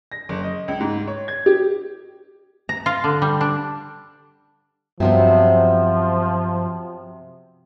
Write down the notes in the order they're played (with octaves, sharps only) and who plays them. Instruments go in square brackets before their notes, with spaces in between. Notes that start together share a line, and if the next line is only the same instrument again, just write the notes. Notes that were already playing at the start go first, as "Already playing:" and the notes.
[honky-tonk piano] A#6
F#1
D#5
C#2
G#2
C#5
G#6
G4
[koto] A#5
F4
D3
G3
D4
[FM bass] G2 [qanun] C3 F#3 B3 [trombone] F3